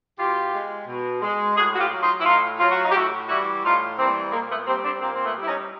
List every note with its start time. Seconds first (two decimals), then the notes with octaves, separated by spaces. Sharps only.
0.18 B2 F4 G4
0.52 G#3
0.88 B2
1.21 G#3
1.56 A2 F#4 G#4
1.75 F#4
1.79 F4 G4
1.91 F#3
2.03 D#4 F4
2.20 E4
2.25 A2 D#4 F4
2.59 F#3 F4
2.71 F#4
2.83 D#4 F4
2.91 G4
2.94 A2 E4 F#4
3.28 E3 G3 E4 F#4
3.63 A2 D#4 F4
3.98 E3 G3 A#3 C4
4.32 A#2 G#3 A#3
4.50 A3 B3
4.66 G3 A#3 C4
4.84 C4 D4
5.01 A#2 A#3 C4
5.14 C4
5.24 A3 B3
5.35 G3
5.42 E4
5.47 C#4 D#4